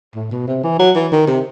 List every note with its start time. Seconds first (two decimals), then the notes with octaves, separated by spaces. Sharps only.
0.15 A2
0.31 B2
0.48 C3
0.64 E3
0.79 F#3
0.96 E3
1.12 D#3
1.28 C3